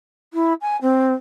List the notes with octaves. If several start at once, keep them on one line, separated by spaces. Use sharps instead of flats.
E4
G#5
C4